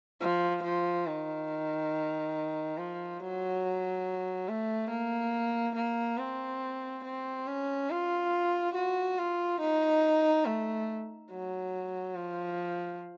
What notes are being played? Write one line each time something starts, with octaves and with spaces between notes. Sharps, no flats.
F3
F3
D#3
F3
F#3
A3
A#3
A#3
C4
C4
C#4
F4
F#4
F4
D#4
A3
F#3
F3